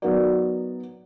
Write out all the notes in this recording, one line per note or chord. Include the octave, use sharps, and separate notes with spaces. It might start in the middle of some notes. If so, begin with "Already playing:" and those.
F#3 B3 D#4 F#4 A#4 D5